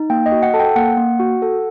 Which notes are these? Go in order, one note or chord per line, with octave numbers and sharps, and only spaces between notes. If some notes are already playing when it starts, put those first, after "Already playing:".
Already playing: D#4
A#3 G5
D#5
F#4
F#5
A4 A5
G5
A#3 F#5
A#3
F#4
A4